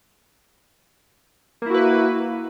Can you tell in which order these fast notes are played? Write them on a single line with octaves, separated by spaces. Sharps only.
A#3 E4 F#4 B4